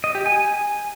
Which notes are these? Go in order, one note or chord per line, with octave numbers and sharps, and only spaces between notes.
D#5
G4
G#5